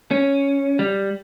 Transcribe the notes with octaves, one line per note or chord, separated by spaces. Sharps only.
C#4
G3